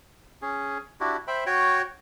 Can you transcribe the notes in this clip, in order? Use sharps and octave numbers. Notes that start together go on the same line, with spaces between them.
C#4 G#4
D4 E4 F#4 G4
C5 E5 G5 B5
F#4 C#5 G5